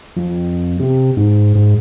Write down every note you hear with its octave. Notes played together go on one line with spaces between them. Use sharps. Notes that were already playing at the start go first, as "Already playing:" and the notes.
F2
C3
G#2
G#2